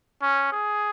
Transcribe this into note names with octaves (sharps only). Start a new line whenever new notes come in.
C#4
G#4